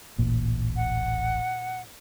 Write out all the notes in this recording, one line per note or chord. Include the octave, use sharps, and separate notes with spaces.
D1 A1 A#2
F#5